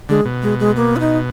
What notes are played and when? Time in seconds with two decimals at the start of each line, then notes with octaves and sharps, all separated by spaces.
0.09 D3 G#3
0.25 B2
0.43 G#3
0.60 G#3
0.76 A#3
0.96 F4
1.00 D#4